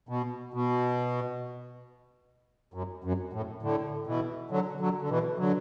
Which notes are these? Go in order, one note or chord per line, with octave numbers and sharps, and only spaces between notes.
B2
B2
F#2
F#2
A2
A2 D3
B2 E3
D3 F#3
D3 F#3
D3
B2 E3
D3 F#3